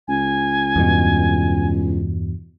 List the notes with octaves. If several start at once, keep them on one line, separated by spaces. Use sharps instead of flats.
C#2 G#5
E2 G2 B2